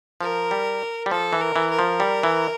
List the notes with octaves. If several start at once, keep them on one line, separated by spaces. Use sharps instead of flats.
F3 A#4
G3
G3
F3 A4
E3
A#4
E3
A#4
F3
G3
E3